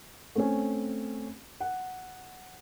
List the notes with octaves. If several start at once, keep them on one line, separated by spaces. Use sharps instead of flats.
A3 C4 C#4
F#5